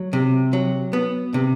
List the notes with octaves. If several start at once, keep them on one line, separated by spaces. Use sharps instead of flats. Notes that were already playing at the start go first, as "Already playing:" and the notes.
Already playing: F#3
C3
F#3
B3
C3